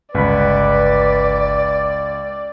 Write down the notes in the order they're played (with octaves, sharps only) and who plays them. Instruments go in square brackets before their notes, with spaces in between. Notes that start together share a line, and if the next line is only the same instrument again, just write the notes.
[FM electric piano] G1 B5 [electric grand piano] C#2 [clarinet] B4 [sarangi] D5